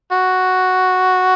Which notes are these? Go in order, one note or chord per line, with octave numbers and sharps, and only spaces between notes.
F#4